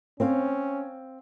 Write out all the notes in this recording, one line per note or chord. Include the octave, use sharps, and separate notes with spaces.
C4 C#4 C5 F5